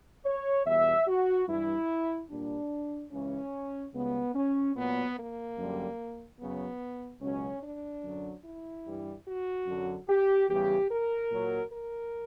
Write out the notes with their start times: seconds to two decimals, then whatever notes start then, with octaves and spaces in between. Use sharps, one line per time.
0.26 C#5
0.66 E2 B2 G3 E5
1.07 F#4
1.48 G2 E3 G3 E4
2.30 A#2 G3 D4
3.12 C#2 C#3 E3 C#4
3.94 C#2 C#3 G3 B3
4.35 C#4
4.76 A#2 F#3 B3
5.17 A#3
5.58 F#2 D3 G3
6.39 F#2 C#3 F#3 B3
7.21 C#2 B2 F#3 C#4
7.63 D4
8.03 F#2 D3 F#3
8.44 E4
8.85 G2 E3 G3
9.27 F#4
9.67 F#2 D3 F#3
10.09 G4
10.49 E2 C#3 E3 G3 G4
10.90 A#4
11.31 A#2 F#3
11.72 A#4